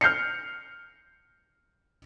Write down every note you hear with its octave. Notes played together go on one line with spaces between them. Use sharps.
F6 G6 C7 C#7